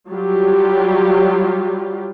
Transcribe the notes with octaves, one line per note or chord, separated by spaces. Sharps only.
F#3 G3 F4 G4